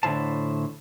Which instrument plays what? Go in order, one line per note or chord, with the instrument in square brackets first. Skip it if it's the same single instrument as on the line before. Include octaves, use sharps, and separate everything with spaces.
[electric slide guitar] A2 D3 E4 C5 A5